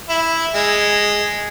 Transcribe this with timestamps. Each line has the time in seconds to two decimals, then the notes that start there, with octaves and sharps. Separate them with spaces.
0.09 E4
0.55 G#3